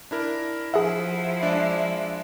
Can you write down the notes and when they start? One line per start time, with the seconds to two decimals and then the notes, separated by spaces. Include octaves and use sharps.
0.11 D4 E4 A#4
0.74 F3 E4 G#4 E5 F#5
1.43 G#3 D4